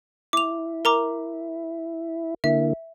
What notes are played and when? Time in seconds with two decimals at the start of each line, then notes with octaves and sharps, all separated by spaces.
0.33 E4 D6 F7
0.85 A#4 A#5 D6
2.44 D3 A#3 E4 E5